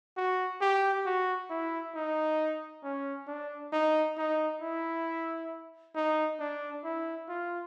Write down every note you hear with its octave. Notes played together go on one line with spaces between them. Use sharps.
F#4
G4
F#4
E4
D#4
C#4
D4
D#4
D#4
E4
D#4
D4
E4
F4